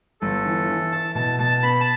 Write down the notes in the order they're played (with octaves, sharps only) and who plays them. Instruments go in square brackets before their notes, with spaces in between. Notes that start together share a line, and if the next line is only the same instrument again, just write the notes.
[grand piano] G1 [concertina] A4
[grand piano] E3
E3
[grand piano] E4 [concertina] A5
[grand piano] B2 [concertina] A5
[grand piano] B2 [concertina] A5
[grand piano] B3 [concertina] B5
[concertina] A5